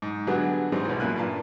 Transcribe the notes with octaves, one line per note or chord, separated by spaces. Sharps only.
G#2
D3 F#3 G3 B3 F#4 G#4
G#2 E3 G3 C4 G#4
B1 E3
F#2 A#2 A#3 E4 G#5 F#6
G2 A#2 A5